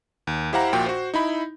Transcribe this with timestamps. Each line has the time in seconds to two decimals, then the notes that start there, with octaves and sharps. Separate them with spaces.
0.27 D#2
0.53 E4 G4 C5 F5 F#5 A#5
0.73 A#1 A#2 F4 F#4 G5
0.86 F#4 C5
1.14 D#4 E4 B5